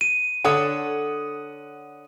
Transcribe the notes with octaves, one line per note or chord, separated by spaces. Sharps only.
D#7
D3 A4 C#5 F#5 D#6